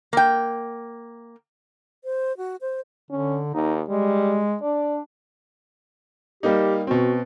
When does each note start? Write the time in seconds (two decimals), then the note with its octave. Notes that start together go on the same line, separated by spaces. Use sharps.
0.13 A#3 G5
2.04 C5
2.37 F#4
2.61 C5
3.11 D3 C#4
3.54 D#2 D#4
3.88 G3 G#3
4.62 D4 D5
6.43 G3 A#3 D#4 G4
6.87 B2 C4 F#4